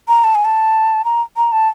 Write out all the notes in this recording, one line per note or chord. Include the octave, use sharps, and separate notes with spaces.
A#5
A5
G#5
A5
A#5
A#5
A5